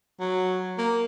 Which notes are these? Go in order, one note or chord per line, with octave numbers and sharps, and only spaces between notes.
F#3
A#3